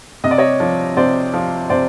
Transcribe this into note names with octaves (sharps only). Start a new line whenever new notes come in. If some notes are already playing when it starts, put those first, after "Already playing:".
C3 D#5
D5
C#5 D#5
F3
C3 C5 D5
F3
C3 C5 D5